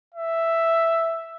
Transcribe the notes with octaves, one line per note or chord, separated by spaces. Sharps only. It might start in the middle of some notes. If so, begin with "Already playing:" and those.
E5